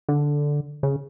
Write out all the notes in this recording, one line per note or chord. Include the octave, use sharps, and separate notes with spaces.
D3
C#3